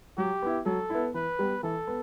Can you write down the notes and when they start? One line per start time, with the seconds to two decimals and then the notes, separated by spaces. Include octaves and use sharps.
0.17 F#3 G4
0.42 B3 E4
0.66 F#3 A4
0.90 B3 E4
1.14 E3 B4
1.39 G3 B3
1.63 E3 A4
1.87 B3